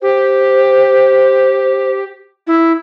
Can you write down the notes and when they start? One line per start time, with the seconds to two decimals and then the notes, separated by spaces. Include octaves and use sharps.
0.02 G4 C5
2.47 E4